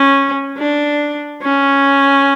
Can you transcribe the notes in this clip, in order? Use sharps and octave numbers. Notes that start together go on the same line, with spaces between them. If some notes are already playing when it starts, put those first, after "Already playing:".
Already playing: C#4
D4
C#4